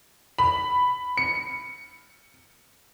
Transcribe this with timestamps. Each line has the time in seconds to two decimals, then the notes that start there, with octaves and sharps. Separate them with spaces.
0.39 B5
1.17 C#7